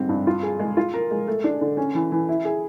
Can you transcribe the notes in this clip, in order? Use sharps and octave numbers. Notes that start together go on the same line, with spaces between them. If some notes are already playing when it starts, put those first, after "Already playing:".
Already playing: G#2 G3 C4
G2
F4
G#4
G#3
F4
A#4
G#3
A3
D4
D3
C#4
E3
E3
E4
G#4